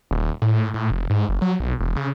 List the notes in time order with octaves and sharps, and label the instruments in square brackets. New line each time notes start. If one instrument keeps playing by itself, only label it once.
[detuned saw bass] D#1
A2
A2
F1
G#2
F#1
F#3
B1
E1
C#3